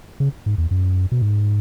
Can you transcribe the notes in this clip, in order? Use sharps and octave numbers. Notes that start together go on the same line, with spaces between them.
C#3
G#2
E2
F#2
B2
G#2